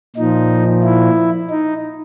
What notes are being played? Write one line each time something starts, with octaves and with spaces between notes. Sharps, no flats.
A#2 F3 D#4
E4
D#4